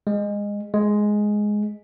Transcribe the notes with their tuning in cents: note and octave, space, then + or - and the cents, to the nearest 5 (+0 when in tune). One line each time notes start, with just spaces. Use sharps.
G#3 -20
G#3 +5